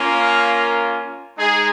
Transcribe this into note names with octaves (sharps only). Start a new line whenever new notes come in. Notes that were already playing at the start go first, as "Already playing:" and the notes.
Already playing: A#3 C#4 F4 A#4
G#3 D#4 G#4